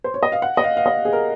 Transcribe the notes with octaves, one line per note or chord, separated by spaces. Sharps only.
C5
C#5
D#5
F5
F#5
D#5
F5
F5
D#5
G#4
A#4